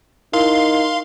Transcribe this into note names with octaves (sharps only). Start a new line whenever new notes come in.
D#4 E4 A#4 F5 C6